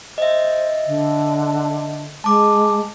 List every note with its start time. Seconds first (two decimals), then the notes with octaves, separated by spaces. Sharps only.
0.18 C5 D#5 E5
0.87 D3
2.24 G#3 A5 D6